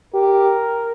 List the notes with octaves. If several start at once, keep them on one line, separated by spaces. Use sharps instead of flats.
G4 A#4